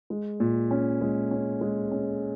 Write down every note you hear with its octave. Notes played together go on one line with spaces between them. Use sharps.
G#3
A#2
C#4
G#3
C#4
G#3
C#4